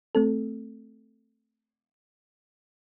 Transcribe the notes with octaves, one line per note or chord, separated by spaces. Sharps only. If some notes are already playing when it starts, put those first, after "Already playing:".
A3 C4 A4